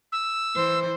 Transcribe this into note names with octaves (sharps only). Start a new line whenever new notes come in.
E6
E3 C5